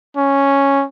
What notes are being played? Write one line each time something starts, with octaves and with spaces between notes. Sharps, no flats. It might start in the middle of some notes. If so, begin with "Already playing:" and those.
C#4